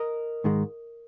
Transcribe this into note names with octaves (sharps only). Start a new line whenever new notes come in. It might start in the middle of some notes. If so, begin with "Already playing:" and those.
Already playing: A#4 D#5
G#2 D#3 G#3